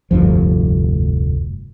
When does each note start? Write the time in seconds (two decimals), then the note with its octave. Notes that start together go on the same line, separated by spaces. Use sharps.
0.11 F1 D2 G2 F3